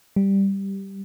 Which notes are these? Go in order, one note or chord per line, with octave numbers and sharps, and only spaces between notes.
G3